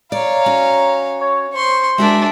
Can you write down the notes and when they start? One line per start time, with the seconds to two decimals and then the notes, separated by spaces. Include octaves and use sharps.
0.12 C#5 D5 F5 A#5
0.46 C#4 F#4
1.20 C#5
1.53 C5 C6 C#6
1.98 G#3 D4 F#4 A#4 E5